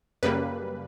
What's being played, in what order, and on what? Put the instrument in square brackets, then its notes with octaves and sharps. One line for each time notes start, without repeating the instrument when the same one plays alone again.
[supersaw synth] F#2 C#3 G3 A#3 B4